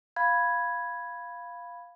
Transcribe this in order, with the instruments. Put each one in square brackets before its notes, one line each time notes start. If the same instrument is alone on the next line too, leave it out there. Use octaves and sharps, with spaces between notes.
[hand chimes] F5 B5 G#6